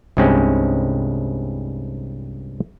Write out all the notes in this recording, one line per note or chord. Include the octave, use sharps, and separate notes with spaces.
C2 G2 G#3 C4 C#4